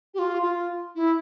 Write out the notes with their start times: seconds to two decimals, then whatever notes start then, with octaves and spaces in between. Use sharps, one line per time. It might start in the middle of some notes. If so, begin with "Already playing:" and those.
0.14 G4
0.19 F4
0.42 F4
0.95 E4